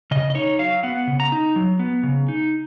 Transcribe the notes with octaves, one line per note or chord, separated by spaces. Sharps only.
C#3 D#5
D#5
D#4 C#5
F#3 F5
B3 F#5
C#3
A#5
D#4
F#3
B3
C#3
D#4